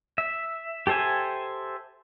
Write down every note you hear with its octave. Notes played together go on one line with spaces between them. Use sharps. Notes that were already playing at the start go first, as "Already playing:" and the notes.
E5
G4 A4 C5 E5 G#5